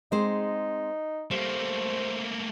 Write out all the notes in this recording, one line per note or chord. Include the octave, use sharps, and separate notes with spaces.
G#3 C4 D#4 C5
G3 A3 A#3 C5